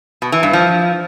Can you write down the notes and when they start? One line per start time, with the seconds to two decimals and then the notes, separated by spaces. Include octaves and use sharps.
0.22 B2
0.32 E3
0.43 G2
0.53 F3